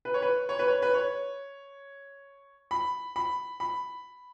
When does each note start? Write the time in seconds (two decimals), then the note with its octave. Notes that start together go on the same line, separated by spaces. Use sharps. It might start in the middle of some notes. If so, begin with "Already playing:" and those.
0.05 B4
0.14 C#5
0.22 B4
0.49 C#5
0.59 B4
0.68 C#5
0.82 B4
0.94 C#5
2.71 B5
3.16 B5
3.60 B5